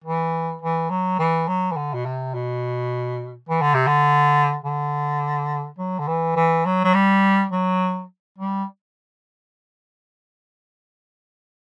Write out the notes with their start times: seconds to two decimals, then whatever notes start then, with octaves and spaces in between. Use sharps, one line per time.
0.04 E3
0.62 E3
0.90 F#3
1.19 E3
1.48 F#3
1.71 E3
1.76 D3
1.94 B2
2.05 C3
2.34 B2
3.49 E3
3.62 D3
3.74 C3
3.87 D3
4.64 D3
5.78 F#3
5.99 D3
6.08 E3
6.36 E3
6.66 F#3
6.84 F#3
6.94 G3
7.52 F#3
8.38 G3